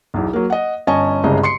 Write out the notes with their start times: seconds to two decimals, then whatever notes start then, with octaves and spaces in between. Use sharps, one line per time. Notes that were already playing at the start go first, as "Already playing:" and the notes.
0.14 B1 E2
0.33 F#3 A#3
0.50 D#5 F#5
0.87 G1 C#4 D#5 G#5 A5 C#6
1.24 G1 C2 C#3 G#3 D#5
1.43 C6 C7 C#7